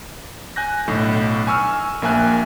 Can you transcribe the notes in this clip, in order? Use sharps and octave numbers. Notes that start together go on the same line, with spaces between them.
G#5 F#6 G6 A#6
B1 A2 D3
G#5 C#6 E6 F6
A#1 A#3 E5 G#5 F#6